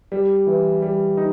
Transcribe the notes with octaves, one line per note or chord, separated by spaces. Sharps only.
G3
E3
G3
D#4